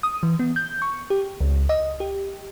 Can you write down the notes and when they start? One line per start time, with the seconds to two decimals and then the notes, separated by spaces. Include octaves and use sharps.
0.03 D#6
0.23 E3
0.39 B3
0.56 G6
0.82 C#6
1.10 G4
1.41 C#2
1.69 D#5
2.00 G4